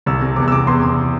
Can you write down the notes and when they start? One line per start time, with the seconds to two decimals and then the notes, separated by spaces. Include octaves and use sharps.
0.06 C2 E6
0.22 C3
0.36 E2 D6
0.48 E6
0.52 C3 D6
0.67 E2 C6
0.83 C3